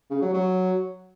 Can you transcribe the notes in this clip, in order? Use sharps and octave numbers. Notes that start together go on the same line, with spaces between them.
C#3
F#3
F#3